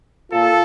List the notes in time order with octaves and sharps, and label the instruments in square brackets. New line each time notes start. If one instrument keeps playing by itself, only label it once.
[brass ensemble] A#2 F4 A4